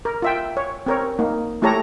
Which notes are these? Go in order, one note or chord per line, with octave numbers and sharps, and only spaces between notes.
A#4
F4 E5 G5
C#5
C4 A#4 C#5
A#3 D#4
A3 E4 G4 A4 C#5 A#5